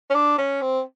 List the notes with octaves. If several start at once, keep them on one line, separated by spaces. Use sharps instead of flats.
C#4
D4
C#4
C4